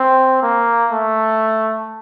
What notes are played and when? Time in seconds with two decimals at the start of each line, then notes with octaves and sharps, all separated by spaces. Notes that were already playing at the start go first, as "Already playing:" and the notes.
Already playing: C4
0.42 A#3
0.92 A3